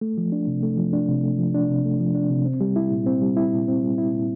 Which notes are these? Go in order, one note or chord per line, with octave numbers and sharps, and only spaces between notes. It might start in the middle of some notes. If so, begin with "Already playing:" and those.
A3
F3
D4
C3
A3
F3
D4
C3
A3
F3
D4
C3
A3
F3
D4
C3
C4
G3
E4
A#2
C4
G3
E4
A#2
C4
G3
E4
A#2